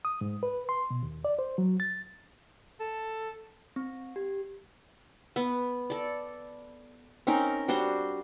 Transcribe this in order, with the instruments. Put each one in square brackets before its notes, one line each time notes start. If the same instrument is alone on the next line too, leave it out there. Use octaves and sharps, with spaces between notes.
[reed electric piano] D#6
G#2
B4
C6
B2
D#2
D5
C5
F#3
A6
[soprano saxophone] A4
[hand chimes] C4
G4
[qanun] B3
A4 D5
C4 C#4 D#4 A#4
G3 D4 F#4 C5